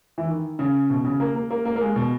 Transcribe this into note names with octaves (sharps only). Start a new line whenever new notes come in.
E3
D#3
C#3
B2
C#3
A#3
A#3
A#3
A#3
A#3
G#3
B2